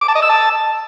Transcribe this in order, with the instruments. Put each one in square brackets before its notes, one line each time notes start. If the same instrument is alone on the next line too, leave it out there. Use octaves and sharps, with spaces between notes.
[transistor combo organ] D6
A5
D#5
E6
A5